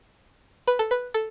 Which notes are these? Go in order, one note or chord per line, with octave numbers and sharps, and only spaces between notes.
B4
A4
B4
A4